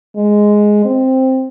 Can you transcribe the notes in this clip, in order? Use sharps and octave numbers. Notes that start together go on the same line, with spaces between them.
G#3
C4